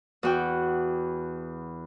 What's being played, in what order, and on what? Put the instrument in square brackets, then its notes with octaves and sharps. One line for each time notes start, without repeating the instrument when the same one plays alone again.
[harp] E2 F#4 G5